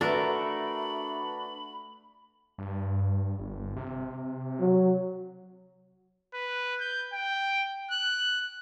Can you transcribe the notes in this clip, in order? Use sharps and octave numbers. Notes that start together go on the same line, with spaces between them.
A3 D4 F#4 A#4 B4 E5 B5
G2
G1
C3
F#3
B4
G6
G5
F#6